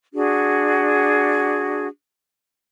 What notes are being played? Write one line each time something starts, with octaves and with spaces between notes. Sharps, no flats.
D4 F#4 G#4